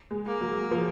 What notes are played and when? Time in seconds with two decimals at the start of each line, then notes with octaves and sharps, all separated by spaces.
0.11 G#3
0.26 A#3
0.41 F#3
0.71 F3